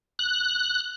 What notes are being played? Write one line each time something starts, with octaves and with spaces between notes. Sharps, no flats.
F#6